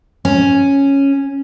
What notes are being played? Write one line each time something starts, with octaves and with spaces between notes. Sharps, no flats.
C#4